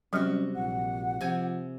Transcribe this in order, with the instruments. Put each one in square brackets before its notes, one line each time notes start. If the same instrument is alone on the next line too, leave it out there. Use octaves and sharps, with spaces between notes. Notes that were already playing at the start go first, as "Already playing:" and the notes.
[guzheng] C3 F#4 [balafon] F#3 G3 [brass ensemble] C#4
[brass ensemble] A#1 [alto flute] F#5
[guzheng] C3 G#5 [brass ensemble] F3